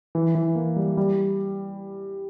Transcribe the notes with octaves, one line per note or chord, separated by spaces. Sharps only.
E3
E3
A#3
G3
G3